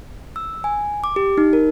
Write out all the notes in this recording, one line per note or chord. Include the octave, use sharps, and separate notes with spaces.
E6
G#5
D6
G4
D#4
A#4